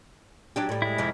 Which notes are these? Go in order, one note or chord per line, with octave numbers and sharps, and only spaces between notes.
F#3 D4 G4
A2 G3
G#3 E4
F2 C3 F3